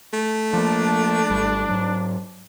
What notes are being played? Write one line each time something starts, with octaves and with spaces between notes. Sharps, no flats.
A3
F3 A#3 D4
G#1 G3
G#2 F#3